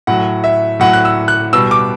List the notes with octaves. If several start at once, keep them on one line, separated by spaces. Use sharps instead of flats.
A2 F#3 F#5
E5
A2 F#3 F#5
F#6
E6
F#6
B2 G3 E6
D6